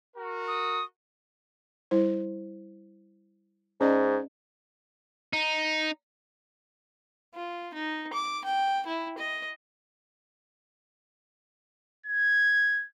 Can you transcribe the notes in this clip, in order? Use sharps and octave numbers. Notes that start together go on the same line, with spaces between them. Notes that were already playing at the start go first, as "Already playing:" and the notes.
F#4 A#4
D#6
G3 E4 C5
G#2 C#4 D5 D#5
D#4
F4
D#4
D6
G5
E4
D#5
G#6